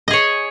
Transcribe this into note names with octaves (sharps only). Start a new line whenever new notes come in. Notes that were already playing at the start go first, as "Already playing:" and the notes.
G#4 C#5 D#5